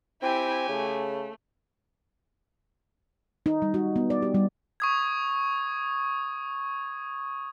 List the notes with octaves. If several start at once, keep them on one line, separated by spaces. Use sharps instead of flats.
C4 E4 G4 G5 G#5
C#3 A3
D#4
G3
F#4
B3
D5
G4
G3
C#6 D#6 G#6